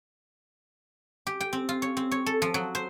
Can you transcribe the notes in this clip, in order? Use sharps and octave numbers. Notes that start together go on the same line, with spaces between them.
G4
G5
C4
F4
C#5
C4
C#5
A4
F3
F#3
C5